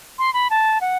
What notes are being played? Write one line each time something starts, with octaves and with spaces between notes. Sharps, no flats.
C6
B5
A5
F#5